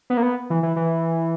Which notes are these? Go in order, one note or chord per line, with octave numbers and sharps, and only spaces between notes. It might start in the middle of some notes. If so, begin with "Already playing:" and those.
B3
A#3
B3
E3
E3
E3